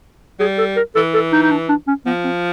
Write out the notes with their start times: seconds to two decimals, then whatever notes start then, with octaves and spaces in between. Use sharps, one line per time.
0.39 G3 G#4
0.58 A4
0.77 A#4
0.95 E3 A4
1.14 A4
1.32 D#4
1.43 D#4
1.51 D4
1.69 D4
1.88 C#4
2.06 F3 B3
2.24 C4